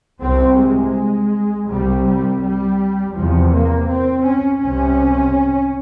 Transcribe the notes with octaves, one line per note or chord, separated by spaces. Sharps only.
C2 C3 C4
G#3
C2 C3 G3
G3
G3
E2 C3 F3
A#3
C4
C#4
C2 C3 C#4